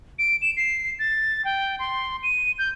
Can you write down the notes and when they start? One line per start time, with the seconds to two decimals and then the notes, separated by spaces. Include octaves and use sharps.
0.19 D7
0.42 E7
0.57 C7
0.99 A6
1.45 G5
1.79 C6
2.23 D#7
2.58 G6